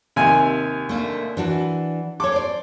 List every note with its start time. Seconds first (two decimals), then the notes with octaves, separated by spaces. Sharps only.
0.16 D#2 C3 G#5
0.89 A3 A#3 D4
1.37 E3 D4 F#4
2.20 A4 C#5 D6
2.32 C5 D5